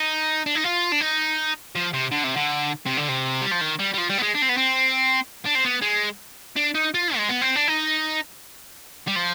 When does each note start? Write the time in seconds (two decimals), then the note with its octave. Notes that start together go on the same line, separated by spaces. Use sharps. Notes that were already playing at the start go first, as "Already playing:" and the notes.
Already playing: D#4
0.46 D4
0.55 D#4
0.64 F4
0.92 D4
1.01 D#4
1.76 F3
1.94 C3
2.12 D3
2.24 C3
2.36 D3
2.86 C3
2.97 D3
3.09 C3
3.41 G3
3.51 F3
3.61 D#3
3.79 G3
3.94 G3
3.98 F3
4.10 G3
4.18 B3
4.23 G#3
4.35 D4
4.42 C4
4.49 B3
4.57 C4
5.45 D4
5.55 C4
5.65 B3
5.82 G#3
6.56 D4
6.75 D#4
6.95 F4
7.16 G#3
7.29 B3
7.41 C4
7.56 D4
7.68 D#4
9.07 G3
9.16 F3